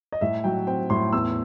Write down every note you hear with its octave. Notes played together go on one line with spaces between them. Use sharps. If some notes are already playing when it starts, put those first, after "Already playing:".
D#5
A2 E5
F#3 G5
C4 G5
A2 C6
E2 E6